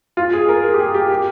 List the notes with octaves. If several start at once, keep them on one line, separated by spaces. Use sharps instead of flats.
F4
G#4
A#4
G#4
G4
G#4
G4
G4